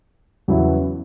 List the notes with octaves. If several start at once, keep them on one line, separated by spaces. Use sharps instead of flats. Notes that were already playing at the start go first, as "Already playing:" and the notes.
E2 C#3 F#3 B3 E4